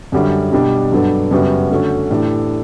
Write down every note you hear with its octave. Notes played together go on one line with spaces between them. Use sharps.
F#2 D3 G3 C#4 F#4
B2 G3 D4 G4
G2 F#3 B3 D4 A4
F#2 C#3 G3 B3 F#4
D3 A3 C#4 F#4
A2 E3 A3 D4 G4